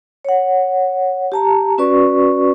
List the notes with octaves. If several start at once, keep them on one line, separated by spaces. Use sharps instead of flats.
C#5 F#5
G4 A5 A#5
C#4 F#4 B4 D5 C#6